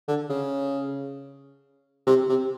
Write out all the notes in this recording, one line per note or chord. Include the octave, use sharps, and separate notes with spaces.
D3
C#3
C3
C3